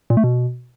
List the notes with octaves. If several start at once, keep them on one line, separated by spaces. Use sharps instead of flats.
A#2
A3
B2